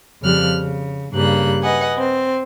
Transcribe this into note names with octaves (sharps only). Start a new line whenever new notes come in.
F2 C#3 F3 G3 F6 F#6
C#3
G2 C#3 G3 A#3 F#6
B4 D#5 F#5 G#5
C4